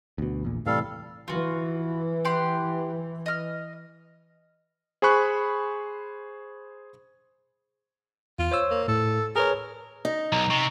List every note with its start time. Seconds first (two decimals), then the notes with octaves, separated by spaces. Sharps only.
0.18 D2 B2
0.43 A#1 E2 A#2
0.66 A2 C3 E3 G3 A4 F5
1.28 E3 F4 F#4
2.25 G4 F#5 C6
3.26 D#5 F6
5.02 G#4 C5 G#5 B5 C#6 F#6
8.39 E2 F4
8.51 C5 C#5 E6
8.71 A#3
8.88 A2 A4
9.36 G#4 A#4 B4 C#5
10.05 D#4 D#5
10.32 B1 A#5
10.50 C3 C#6